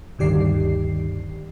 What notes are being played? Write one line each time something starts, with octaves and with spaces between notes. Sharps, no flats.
D2 G2 D#3 G4 D5 C7